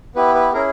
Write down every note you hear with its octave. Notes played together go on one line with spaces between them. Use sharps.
B3 E4 G4 B4
B4
C#4 E4 G#4 A#4